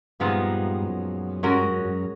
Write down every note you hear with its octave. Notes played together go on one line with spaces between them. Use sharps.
G2 A#2 F3 G#3 B3 D#4
F#2
G2 G#3 C#4 F#4 A#4
F#2
F#2